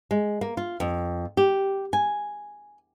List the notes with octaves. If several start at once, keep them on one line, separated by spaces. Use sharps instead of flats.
G#3
A#3
F4
F2
G4
G#5